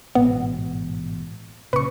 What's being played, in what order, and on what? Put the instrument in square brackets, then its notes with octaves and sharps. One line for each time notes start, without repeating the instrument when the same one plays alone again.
[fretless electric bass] A1 G#2 B2 [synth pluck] B3
[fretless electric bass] B1 A#2 C#3 [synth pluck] B4 C#6